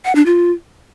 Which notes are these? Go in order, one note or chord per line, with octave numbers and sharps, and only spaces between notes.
F#5
D4
F4